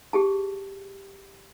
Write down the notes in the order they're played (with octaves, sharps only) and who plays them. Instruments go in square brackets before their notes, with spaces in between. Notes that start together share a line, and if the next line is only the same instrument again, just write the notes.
[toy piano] G4 G#4 A5